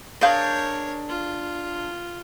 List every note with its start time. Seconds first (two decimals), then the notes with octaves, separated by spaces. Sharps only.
0.21 D4 G#4 A#4 C#5 D#5 F5 G6
1.09 F4